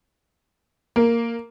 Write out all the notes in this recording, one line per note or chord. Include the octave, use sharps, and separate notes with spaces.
A#3